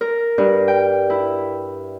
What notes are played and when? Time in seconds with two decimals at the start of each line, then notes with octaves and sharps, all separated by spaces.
0.01 A#4
0.38 G2
0.68 G5
1.10 E4